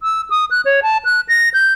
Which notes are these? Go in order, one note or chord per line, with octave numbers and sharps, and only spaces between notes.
E6
D#6
F#6
C#5
A5
F#6
A#6
G6